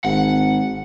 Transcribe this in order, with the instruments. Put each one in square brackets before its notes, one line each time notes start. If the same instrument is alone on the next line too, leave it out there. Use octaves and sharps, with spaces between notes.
[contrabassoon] G#1 [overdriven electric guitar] F#5